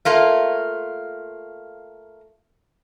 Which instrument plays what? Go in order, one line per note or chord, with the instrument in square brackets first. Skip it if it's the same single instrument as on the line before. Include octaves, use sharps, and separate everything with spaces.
[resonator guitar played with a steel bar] A3 A#3 F4